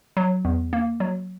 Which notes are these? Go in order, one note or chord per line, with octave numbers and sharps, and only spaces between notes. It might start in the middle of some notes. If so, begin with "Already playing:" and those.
F#3
E2
A#3
F#3